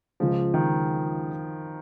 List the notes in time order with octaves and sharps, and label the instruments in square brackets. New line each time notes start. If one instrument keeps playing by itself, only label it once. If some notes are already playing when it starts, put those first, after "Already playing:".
[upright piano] C#2 C#3 G#3 [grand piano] F3
[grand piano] D#3